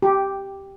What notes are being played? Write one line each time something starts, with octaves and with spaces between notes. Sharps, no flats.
G4